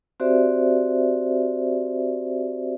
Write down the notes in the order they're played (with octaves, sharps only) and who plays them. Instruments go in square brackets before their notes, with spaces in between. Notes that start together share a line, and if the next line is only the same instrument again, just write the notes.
[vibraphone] C4 F#4 G4 C5 D5 E5